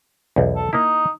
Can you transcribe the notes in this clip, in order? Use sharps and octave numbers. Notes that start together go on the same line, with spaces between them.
B1 E2
A4
A#3 D#4 E4